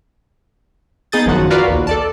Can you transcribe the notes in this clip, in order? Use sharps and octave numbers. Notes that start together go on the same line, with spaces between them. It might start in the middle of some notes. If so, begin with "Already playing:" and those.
B3 D#4 G#4 D#6 G6 A6
A1 F#2 D#3 F3 F#4 F#5
F4 F#4 A#4 B4 D5 F5
A#1 D#2
A4 D5 A5